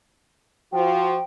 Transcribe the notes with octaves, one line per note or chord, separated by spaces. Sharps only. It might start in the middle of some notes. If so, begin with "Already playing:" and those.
F3 F#4 G5